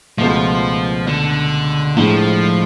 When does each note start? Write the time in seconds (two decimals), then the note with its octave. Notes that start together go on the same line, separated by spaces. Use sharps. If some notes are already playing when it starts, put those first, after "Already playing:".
0.18 C#2 B2 F3 A3
1.08 D3
1.96 A2 F3 G#3 D4